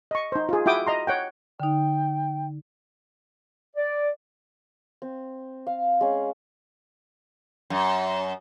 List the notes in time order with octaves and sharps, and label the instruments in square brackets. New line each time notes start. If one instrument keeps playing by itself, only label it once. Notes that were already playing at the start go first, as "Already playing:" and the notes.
[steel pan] D#5 C#6
D#4 C5
F4 G#4
E4 F#4 G5 D6 D#6
D#5 A#5 C6
C#5 F#5 G5
[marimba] D3 D#4 [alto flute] G5
[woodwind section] D5
[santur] C4
F5
G#3 C#4
[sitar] F#2